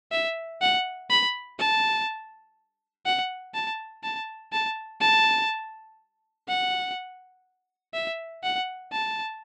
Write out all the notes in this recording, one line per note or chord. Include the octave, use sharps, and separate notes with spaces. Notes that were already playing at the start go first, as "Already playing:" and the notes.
E5
F#5
B5
A5
F#5
A5
A5
A5
A5
F#5
E5
F#5
A5